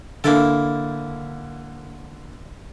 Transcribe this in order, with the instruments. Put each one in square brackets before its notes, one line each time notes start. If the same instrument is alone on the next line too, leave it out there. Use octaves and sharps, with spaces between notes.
[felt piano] D3 [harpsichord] A#3 E4 A4